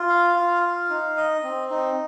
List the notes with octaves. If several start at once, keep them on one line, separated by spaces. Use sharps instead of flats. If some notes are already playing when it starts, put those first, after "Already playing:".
Already playing: F4
F5
F4
F5
D#4
D#5
C4
D#4